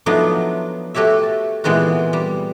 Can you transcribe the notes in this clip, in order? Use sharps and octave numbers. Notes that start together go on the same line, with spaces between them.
F3 F#3 A3 B3 D4 D#4
A3 F#4 G4 C#5 E5
A5
A#2 E3 G#3 B3 C4 F#4
G3